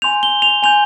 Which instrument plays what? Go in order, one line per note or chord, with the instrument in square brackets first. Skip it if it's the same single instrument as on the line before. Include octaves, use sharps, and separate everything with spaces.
[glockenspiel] G#5 C6 G6 F7
G7
F7
G#5 C6 G6 F7